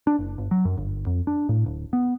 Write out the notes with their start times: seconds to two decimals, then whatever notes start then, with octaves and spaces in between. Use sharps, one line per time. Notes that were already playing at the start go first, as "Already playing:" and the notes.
0.07 D4
0.19 F#1
0.38 G1
0.51 F#3
0.65 F#2
0.77 G1
1.07 F2
1.27 D4
1.49 A2
1.66 D1
1.93 B3